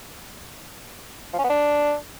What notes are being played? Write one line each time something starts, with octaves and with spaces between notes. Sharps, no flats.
F3
C#4
B3
D4